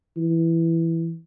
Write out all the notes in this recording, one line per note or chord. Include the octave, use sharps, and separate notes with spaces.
E3